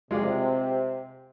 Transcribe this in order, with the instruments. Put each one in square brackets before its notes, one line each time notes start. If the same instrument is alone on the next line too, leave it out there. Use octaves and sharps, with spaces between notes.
[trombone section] C3 [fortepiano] G#3 F4 D5